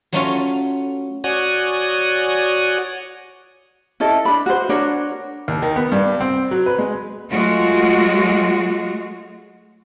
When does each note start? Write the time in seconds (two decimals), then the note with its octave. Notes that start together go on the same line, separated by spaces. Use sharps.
0.13 F#3 A3 C#4 F4
1.24 F#4 C#5 D5 F#5 G#5 D#6
4.00 C#4 E4 A4 D#5
4.25 D4 B5
4.46 F#4 C5
4.69 D4 F#4 A#4 C#5
5.48 D#2
5.62 D#3
5.76 B3
5.92 G2
6.21 C4
6.51 F#3
6.66 B4
6.79 G#3
7.31 F#3 G#3 A3 F4 F#4